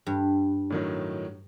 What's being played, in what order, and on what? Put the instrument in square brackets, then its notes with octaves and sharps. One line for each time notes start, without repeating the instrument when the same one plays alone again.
[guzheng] G2
[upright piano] A2 D#3 F#3